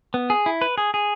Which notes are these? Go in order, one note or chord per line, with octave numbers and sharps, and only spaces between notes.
B3
G#4
E4
B4
G#4
G#4